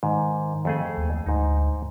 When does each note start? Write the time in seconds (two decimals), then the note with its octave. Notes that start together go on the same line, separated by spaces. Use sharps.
0.03 G#2 D#3
0.65 F2 A3 G#4
0.97 D#2
1.26 D2 G#2 D#4